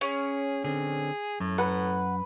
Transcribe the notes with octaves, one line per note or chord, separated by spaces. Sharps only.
C#4 G#4
D3 C4 G#4
F#2 A2
B4 F#5